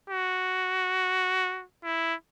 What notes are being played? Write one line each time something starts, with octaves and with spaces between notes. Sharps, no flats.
F#4
E4